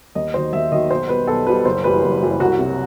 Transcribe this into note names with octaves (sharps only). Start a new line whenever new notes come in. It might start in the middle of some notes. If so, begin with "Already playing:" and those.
D#2 D#5
D#3 F#3 C5
D#2 E5
D#3 F#3 D#5
B1 C5
B2 G3 B4
B1 A4
B2 G3 B4
F#1 C5
F#2 E3 G3 B4
F#1
F#2 E3 G3
C2 F#4
C3 F#3